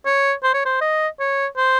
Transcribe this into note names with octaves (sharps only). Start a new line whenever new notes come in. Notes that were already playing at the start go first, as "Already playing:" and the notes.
C#5
C5
C#5
C5
D#5
C#5
C5